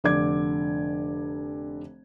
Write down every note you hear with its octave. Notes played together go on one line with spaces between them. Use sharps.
F1 D3 D5 D6 G#6